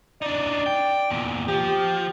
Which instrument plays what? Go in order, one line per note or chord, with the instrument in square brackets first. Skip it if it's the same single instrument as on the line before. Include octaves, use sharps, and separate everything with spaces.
[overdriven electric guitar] D4 D#4 [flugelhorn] D5
[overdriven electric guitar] G5
E2 A#2
[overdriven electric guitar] F3 [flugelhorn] G4